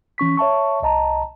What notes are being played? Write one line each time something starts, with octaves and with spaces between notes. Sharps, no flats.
E3 C#4 C#6 B6
C#5 E5 A5 C#6
C2 D#5 A5 A#5